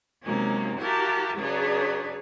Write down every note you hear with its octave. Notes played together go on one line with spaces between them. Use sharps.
C3 F#3 G#3 A#3 C#4 D#4
E4 F#4 G4 A#4 F5 A5
C#3 F#3 D4 G#4 B4 C#5